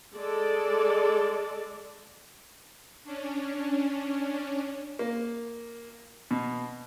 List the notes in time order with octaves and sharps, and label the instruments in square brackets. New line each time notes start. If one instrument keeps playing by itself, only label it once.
[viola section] G#3 A4 D5
[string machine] C#4 D4
[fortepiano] A#3
B2